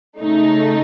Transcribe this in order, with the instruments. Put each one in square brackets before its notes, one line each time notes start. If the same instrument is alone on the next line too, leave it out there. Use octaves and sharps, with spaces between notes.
[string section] C#3 A3 D#4